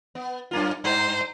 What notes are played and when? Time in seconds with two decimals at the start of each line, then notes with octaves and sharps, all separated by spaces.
0.15 B3
0.51 F#2 A#3 F4
0.84 G2 C5